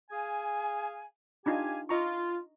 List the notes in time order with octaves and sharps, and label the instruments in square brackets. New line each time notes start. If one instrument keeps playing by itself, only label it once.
[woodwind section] G#4 F5 G#5
[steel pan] D4 D#4 F4 [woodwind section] G4 F5 G#5
[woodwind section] F4 [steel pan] D#5 A#5 C#6